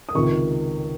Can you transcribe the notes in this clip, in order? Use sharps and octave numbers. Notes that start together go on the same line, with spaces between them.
D#6
C#2 C3 D#3 C#6